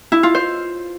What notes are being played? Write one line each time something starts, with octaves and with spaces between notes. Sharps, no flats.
E4
F4
C5